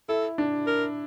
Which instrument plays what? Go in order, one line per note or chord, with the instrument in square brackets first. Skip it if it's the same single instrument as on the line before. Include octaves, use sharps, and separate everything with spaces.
[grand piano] E4 [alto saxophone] A4
[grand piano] D4
[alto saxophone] A#4